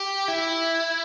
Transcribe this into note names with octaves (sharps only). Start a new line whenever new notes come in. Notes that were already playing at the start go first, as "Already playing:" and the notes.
Already playing: G4
E4